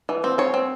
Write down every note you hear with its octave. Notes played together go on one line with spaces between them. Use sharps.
E3
C4
C4 C#5
C4